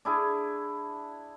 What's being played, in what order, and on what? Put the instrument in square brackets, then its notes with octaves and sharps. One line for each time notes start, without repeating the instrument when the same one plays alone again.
[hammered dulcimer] D4 E4 G#4